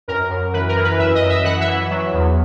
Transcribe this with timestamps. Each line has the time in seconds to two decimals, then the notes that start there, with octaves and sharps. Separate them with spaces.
0.08 F#2 A#4
0.30 F#2
0.53 E3 B4
0.68 A#4
0.76 E3
0.84 B4
0.98 F#2 E5
1.15 D#5
1.21 F#2
1.29 E5
1.44 E3 F#5
1.60 E5
1.68 E3
1.90 F#3
2.14 E2